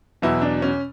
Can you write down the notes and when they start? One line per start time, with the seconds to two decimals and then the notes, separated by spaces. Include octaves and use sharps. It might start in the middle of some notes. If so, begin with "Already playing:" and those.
0.22 E2 B2 F#3 E4
0.42 D4
0.62 C#4